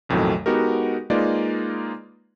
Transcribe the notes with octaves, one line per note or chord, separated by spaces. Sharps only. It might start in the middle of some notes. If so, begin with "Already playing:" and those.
B1 F2 A2 D#3 F#3 A3
G#3 B3 D#4 F#4 G4 A#4
G#3 A#3 D#4 F4 B4 D5